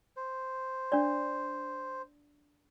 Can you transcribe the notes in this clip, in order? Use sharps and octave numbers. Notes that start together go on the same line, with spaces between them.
C5
D4 D5